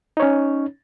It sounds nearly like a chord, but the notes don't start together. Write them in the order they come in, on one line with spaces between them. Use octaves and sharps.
D#4 C#5 C#4